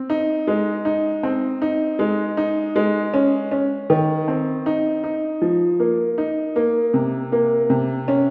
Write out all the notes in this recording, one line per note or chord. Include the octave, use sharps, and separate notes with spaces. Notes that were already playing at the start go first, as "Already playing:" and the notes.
Already playing: C4
D#4
G#3
D#4
C4
D#4
G#3
D#4
G#3
C#4
C#4
D#3
C4
D#4
D#4
F3
A#3
D#4
A#3
C3
A#3
C3
C#4